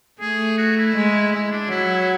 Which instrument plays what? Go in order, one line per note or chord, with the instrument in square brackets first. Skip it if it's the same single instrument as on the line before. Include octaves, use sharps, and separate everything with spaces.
[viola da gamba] A3 [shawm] G#4
[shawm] F#4
E4
[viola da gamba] G#3
[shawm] E4
D4
[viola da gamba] F#3 [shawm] E4